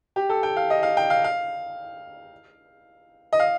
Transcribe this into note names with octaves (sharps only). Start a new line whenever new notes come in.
G4
A4
G5
F5
D#5
F5
G5
F5
F5
D#5
F5